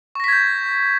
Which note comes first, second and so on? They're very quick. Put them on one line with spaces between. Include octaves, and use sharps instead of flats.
C#6 A#6 B6 G#6 G6